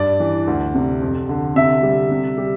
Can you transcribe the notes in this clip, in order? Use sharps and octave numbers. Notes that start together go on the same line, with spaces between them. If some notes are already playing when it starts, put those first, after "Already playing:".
Already playing: G2 D5
E3
D2
C3
F2
D3
C3 E5
G3
C3
G3